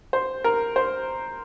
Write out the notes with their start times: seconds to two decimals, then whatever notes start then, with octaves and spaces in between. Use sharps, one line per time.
0.13 C5
0.44 A#4
0.76 C5